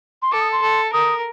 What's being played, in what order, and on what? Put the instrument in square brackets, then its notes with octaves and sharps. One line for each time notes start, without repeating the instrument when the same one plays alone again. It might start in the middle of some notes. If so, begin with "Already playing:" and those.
[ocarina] C6
[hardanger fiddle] A4 [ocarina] D6
[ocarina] D#6
C6
[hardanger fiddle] A4
[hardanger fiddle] A#4 [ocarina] D#6